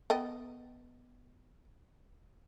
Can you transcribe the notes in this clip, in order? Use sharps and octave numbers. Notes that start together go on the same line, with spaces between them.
B3 D#5 G5